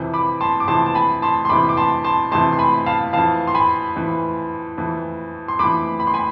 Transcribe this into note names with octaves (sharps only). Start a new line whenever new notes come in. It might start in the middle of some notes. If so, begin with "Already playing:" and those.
Already playing: F2 C3 E3
B5 D6
A5 C6
D6
F2 C3 E3 A5 C6
A5
G#5 B5
A5 C6
C6
F2 C3 E3 B5 D6
D6
A5 C6
A5 C6
F2 C3 E3 A5 C6
C6
G#5 B5
F5 A5
F2 E3 F5 A5
C6
G#5 B5
F2 E3
F2 E3
C6
F2 E3 B5 D6
B5
C6
G#5 B5